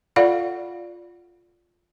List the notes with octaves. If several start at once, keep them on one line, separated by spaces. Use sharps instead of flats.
F4 A4 D5 F5 F#5 B5